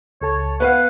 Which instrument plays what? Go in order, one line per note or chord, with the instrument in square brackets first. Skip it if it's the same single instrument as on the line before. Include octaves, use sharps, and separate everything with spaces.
[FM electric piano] C#2 A4 A5 [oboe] C#5
[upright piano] B3 B4 F5 [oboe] F#5